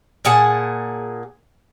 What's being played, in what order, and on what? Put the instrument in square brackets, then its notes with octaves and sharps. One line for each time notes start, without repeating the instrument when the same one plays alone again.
[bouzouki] A#2 G#4 F#5 A5